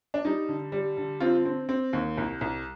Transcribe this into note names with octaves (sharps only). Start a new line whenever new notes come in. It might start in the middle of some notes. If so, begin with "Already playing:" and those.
D4
G3 D#4
D3
G3
D3
C4 F4
C4
C4
D#2
C2
C2